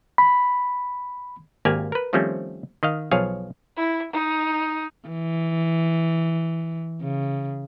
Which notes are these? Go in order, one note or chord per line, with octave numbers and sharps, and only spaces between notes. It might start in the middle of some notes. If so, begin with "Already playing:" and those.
B5
G#1 A#3 G4 D5 F5 G#5
A#4 B4
D#3 F3 G3 A3 C4 C#4
D#3 D#5 F5
B1 F3 G#4 C#5 F5
E4
D#4
E3
C#3